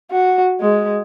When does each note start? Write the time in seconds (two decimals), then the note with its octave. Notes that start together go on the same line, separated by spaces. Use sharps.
0.11 F#4
0.61 G#3